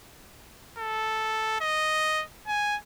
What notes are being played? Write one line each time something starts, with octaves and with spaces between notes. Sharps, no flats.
A4
D#5
G#5